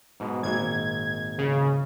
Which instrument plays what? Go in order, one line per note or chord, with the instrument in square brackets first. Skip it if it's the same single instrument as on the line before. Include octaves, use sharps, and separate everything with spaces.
[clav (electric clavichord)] G#2 B2
[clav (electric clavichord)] G#1 A#2 [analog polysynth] G#6
[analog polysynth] C#3